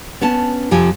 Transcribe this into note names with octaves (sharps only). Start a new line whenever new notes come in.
B3 C#4 A5
F2 C3 F3 G4 G#5